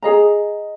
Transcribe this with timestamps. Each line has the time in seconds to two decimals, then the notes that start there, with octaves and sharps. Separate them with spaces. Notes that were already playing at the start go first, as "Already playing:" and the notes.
0.02 G#4 D#5 A#5